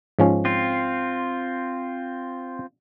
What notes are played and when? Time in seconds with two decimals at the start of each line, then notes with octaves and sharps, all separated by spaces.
0.19 G#2 F3 C#4
0.45 C4 F4